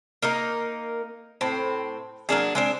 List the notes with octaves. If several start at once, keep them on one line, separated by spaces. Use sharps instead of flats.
A#3 D#4 A#4
A2 C4
F#3 A#3 D4 G#4
G#3 C4 D4